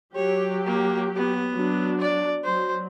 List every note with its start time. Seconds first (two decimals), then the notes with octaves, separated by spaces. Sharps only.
0.16 F#3 G4 C#5
0.66 A#3
1.16 B3
1.52 F#3 D4
2.00 D5
2.44 F#3 C5